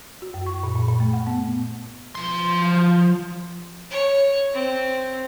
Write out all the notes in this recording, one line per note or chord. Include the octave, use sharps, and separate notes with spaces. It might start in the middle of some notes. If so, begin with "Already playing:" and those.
F#4
F#2
C#6
A#2
A#2
A#2
A3
F#5
B3
F3 C6
C#5
C4